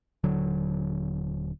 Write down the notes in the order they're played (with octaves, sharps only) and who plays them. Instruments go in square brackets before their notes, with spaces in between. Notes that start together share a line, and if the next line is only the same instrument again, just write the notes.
[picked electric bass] D#1 D3 F#3